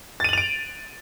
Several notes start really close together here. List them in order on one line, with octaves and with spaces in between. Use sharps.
A6 D#7 F#7 F7 D7